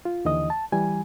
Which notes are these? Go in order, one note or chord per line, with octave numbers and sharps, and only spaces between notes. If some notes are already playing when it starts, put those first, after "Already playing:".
F4
D#2 D3 E3 D#5 D#6
A5
E3 G3 G#5